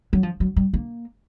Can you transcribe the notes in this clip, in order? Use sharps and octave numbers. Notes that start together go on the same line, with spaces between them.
F#3
F3
F#3
G3
A#3